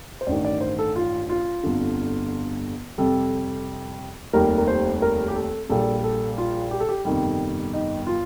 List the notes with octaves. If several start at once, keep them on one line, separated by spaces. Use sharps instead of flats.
C5
A1 G2 D#3 D5
D5
C5
A4
F4
F4
G1 F2 D3
F2 C3 G3 A4
F1 D#2 D#3 G3 A#4
A#4
C5
A#4
G4
A4
A#1 A#2 G3 A4
A4
F4
G4
A4
G4
G1 F2 C3 D#3 G3
D#4
F4